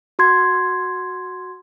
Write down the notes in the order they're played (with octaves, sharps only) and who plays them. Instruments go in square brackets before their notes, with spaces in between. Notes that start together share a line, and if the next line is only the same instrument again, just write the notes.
[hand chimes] F#4 C6 G#6